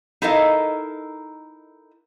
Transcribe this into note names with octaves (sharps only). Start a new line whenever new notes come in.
D#4 E4 A4 A#4 D#5 F5